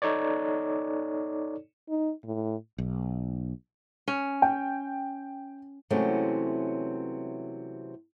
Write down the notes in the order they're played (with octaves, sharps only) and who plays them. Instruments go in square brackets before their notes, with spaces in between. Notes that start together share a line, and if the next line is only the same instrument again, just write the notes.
[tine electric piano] D#4 A4 C#5 D5
[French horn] D#4
A2
[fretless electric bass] B1
[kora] C#4
[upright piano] G5
[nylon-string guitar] C3 E3 F#3 G#3 A3 C#4